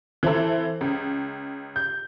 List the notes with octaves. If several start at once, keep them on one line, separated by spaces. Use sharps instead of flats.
E3 C4 E4 A4
C#2
G6